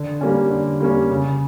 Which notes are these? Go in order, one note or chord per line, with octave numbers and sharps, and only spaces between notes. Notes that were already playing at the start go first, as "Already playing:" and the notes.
Already playing: D3
G3 A#3 C#4
D3
G3 A#3 C#4
C#3